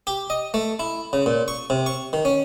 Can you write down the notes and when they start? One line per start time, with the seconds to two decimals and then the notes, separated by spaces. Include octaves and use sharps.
0.07 G4
0.30 D#5
0.54 A3
0.79 E4
1.13 C#3
1.26 A#2
1.48 C#6
1.70 C3
1.86 C#6
2.13 D#3
2.25 C#4